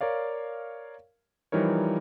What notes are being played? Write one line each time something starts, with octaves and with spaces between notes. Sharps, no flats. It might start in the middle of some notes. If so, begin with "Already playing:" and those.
A#4 C#5 D5 F5
E3 F3 G3 D#4 A#4 C#5